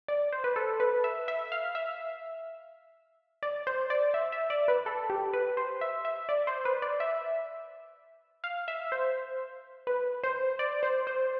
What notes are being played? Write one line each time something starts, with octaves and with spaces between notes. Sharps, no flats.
D5
C5
B4
A4
B4
E5
E5
F5
E5
D5
C5
D5
E5
E5
D5
B4
A4
G4
B4
C5
E5
E5
D5
C5
B4
D5
E5
F5
E5
C5
B4
C5
D5
C5
C5